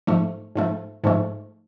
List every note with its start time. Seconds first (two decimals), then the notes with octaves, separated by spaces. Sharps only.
0.07 G#2 F3 A3
0.55 G#2 F3 A3
1.04 G#2 F3 A3